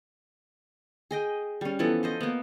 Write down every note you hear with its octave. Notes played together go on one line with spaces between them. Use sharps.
G#4 D#5 G5
G3 C#4
E3 F3 B3 A4
A4 C5 D#5
A#3 B3